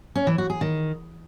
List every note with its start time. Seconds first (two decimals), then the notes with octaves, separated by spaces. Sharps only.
0.15 C#4
0.27 E3
0.38 F#4
0.50 G#4
0.61 D#3